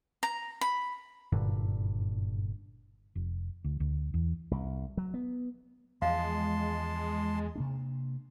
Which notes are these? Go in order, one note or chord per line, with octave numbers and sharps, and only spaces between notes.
A#5
B5
F#1 G2 A#2 D3
F1
D2
D2
E2
C2
F#3
B3
E2 F3 G#3 D#5 F5 A5 C6
C3 A#3 D4